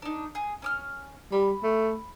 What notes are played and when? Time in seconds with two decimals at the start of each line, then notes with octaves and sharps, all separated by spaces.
0.02 D4 D#4
0.35 G#4
0.62 C#4 D6 F6
1.32 G3 B5
1.64 A3